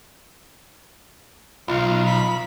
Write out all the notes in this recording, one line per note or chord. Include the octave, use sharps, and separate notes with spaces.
B1 F4
B5